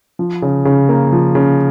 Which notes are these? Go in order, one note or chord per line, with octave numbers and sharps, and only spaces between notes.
F3
C#3
C#3
A#3
F3
C#3